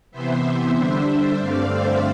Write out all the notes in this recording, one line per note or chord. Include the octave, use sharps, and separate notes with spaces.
C3 E3 B3 C5 E5
D3 G3 D4
G2 D3 A3 C4 D5 F5
C5 E5